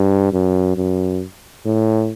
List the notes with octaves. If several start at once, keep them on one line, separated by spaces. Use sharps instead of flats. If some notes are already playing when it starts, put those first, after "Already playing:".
Already playing: G2
F#2
F#2
A2